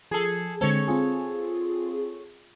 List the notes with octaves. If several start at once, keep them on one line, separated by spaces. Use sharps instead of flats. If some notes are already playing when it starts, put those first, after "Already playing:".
F3 G#4 A4
D3 G#3 C4 A4 C#5
C4 F4 G#4